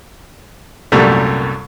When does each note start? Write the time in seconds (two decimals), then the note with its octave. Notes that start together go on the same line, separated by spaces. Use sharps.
0.92 C2 F#2 A#2 F#3 G3 A3